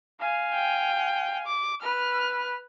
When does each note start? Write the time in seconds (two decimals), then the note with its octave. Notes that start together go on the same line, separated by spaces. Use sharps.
0.20 F5 G#5
0.54 G5
1.47 D6
1.82 B4 F6